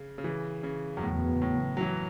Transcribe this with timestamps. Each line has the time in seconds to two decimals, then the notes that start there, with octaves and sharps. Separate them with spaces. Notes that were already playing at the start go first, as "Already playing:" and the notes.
Already playing: C#3
0.18 C#3
0.24 E3
0.63 C#3
0.97 F#2
1.03 E2 A2 C#3 F#3 B3
1.42 A2
1.77 F#3
1.81 E3